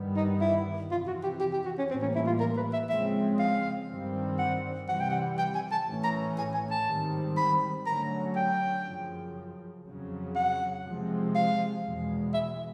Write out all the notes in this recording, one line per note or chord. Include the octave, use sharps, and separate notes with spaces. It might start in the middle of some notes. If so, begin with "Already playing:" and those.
Already playing: G2 D#3 G3 B3
D#4
E4
F2 C3 E3 F4
F#4
G4
G4
G4
F#4
C#4
A2 E3 G3 A#3 C4
C#4
E4
F4
A#4
B4
E5
C#3 F3 G#3 C4 E5
F5
G2 D#3 G3 C4
F#5
C3 E3 G3 F#5
G5
F#5
G5
G#5
A5
A2 E3 A3 C#4
A#5
G#5
G#5
A5
G#2 D#3 G3 C4
B5
D3 F#3 A3 C#4 A#5
G5
F#2 C#3 F3
F2 C#3 F#3
F#5
C3 F3 G#3 C4
F5
E2 B2 G#3
E5